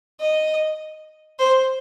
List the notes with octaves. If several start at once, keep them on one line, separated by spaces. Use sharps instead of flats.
D#5
C5